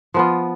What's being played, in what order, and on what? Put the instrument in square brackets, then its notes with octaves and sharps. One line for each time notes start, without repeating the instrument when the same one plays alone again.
[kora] F3 B3 F4